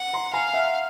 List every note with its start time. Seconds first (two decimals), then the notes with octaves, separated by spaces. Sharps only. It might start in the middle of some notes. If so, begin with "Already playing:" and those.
Already playing: F#5
0.13 A#5 C6
0.33 F5 G#5 A#5
0.54 E5 F#5